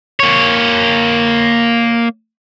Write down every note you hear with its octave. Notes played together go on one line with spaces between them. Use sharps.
A#3 C#5